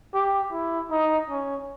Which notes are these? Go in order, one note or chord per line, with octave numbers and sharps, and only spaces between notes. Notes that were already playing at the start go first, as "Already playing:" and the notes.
G4
E4
D#4
C#4